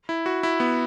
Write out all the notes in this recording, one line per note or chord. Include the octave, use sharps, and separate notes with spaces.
E4
F#4
E4
B3